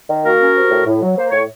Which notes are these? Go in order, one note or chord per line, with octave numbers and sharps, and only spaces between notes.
D#3
A#3 F#4 A#4
C#4
C3
A2
A2
F#3
A#3 C5
A2 C#5